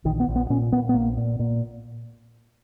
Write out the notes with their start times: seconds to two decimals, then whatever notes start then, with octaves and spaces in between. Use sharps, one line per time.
0.05 A#1 D#3
0.20 B3
0.28 A#1
0.36 B3
0.50 A#2 C#4
0.72 A#2 B3
0.89 B3
0.94 A#1 A#3
1.17 A#2
1.39 A#2